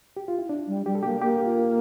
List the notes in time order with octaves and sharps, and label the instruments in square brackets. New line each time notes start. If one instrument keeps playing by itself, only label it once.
[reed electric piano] G4
F4
E4
D4
[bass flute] G3
[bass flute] G3 [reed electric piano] G4
[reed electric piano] A4
[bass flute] A#3 [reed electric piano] G4
[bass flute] A#3 [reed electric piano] G4
[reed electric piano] F4